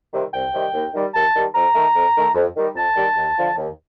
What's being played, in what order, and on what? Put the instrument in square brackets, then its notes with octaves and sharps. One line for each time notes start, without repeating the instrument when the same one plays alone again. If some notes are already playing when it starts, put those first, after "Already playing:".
[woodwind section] C3 D#3 G3
C2 G5
C3 D#3 G3
D#2
D#3 G3
D#2 A5
D#3 G3
F2 A#5
D#3 A3
F2
D#3 A3
F2
D#3 G3
F2 A5
D#3 G3
D#2
D3 F3
D#2